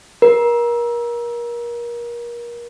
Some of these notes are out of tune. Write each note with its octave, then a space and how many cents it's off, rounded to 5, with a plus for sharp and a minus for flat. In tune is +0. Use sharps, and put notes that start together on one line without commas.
A#4 +30